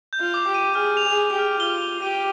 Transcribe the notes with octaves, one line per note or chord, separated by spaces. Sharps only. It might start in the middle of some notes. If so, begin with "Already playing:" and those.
G6
F4
D6
G4
D#7
G#4 F6
F7
G#4
F7
G4
F6
F4 G7
G7
G4 D#7